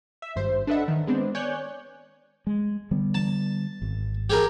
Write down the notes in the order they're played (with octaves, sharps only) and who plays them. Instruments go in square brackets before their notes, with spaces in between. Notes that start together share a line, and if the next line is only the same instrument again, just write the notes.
[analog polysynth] E5
G#1 G2 C5
D4 A4 B4 D#5 E5 F#5
D#3
G#3 B3 C4 D4
C#5 D5 G#5 F#6 G6
[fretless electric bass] G#3
D3 G3 B3
[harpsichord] A5
[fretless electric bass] G#1
[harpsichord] G4 G#4 A#4